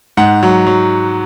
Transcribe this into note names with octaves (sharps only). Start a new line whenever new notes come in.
G#2 F#5
F#3
F#3